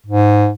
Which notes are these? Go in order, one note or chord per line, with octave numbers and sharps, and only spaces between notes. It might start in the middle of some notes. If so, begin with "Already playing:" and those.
G#2